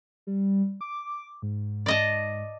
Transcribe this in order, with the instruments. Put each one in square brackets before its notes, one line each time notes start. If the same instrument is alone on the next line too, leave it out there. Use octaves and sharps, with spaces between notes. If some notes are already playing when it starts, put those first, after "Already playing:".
[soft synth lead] G3
D6
G#2
[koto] D5 D#5 A5